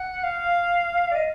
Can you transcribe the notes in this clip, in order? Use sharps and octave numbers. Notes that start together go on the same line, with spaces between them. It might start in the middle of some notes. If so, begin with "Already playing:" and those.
Already playing: F#5
F5
D5
D#5